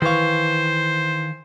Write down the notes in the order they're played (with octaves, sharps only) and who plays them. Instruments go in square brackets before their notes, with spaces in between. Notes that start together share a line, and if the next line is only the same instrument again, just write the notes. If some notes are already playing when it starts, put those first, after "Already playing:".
[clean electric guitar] D#3 F5 [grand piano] E3 C#6 [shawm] C5